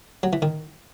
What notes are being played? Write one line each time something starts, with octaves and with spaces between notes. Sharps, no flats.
F#3
E3
D#3